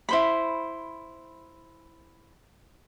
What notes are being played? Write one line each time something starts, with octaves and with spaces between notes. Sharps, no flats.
E4 C5 B5